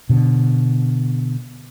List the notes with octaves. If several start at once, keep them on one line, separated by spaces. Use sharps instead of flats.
B2 D3